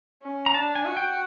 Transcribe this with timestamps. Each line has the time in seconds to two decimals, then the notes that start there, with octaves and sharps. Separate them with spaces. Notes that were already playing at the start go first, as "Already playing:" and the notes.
0.23 C#4
0.46 A#5
0.54 D4 A5
0.75 G#5
0.86 F#4
0.97 G5